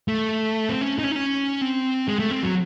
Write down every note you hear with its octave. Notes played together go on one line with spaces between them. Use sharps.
A3
C4
C#4
D#4
C#4
D#4
C#4
C4
G#3
A3
C4
F#3